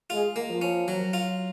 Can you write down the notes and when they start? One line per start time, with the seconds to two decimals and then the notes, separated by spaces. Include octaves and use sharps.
0.10 G#3 F4
0.36 A#3
0.49 F3
0.62 C#4
0.88 F#3
1.13 F4